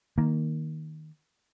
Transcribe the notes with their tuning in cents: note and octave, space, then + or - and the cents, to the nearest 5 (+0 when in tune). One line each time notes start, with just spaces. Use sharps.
D#3 +0 A#3 +0